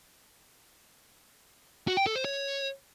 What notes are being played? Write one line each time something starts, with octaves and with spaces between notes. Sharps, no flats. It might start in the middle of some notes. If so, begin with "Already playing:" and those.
F#4
G5
A4
C5
C#5